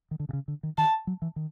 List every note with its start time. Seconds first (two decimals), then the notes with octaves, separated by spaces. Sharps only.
0.11 D#3
0.20 D3
0.29 C3
0.33 C#3
0.48 D3
0.63 D#3
0.78 D#3 A5
1.07 F#3
1.22 E3
1.36 D#3